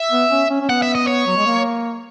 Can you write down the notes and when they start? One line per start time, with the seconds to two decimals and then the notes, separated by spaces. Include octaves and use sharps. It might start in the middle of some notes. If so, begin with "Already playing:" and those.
Already playing: E5
0.12 B3
0.31 C#4
0.50 C#4
0.61 C#4
0.69 B3 F#5
0.82 E5
0.95 D#5
1.07 C#5
1.27 F#3
1.36 G#3
1.46 A#3